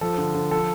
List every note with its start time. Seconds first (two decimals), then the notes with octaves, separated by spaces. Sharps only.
0.01 F3 A4
0.18 D3
0.35 D3
0.51 F3 A4